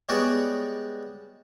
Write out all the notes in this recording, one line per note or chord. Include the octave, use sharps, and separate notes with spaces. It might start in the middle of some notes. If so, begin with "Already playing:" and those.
G3 G#3 B3 F#4 C#5 D5